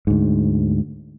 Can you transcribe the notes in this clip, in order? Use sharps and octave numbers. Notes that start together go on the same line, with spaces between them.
D2 G#2